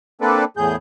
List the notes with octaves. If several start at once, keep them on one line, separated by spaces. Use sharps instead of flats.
A#3 C4 D4 A4 B4 D5
E2 A2 G#4 G6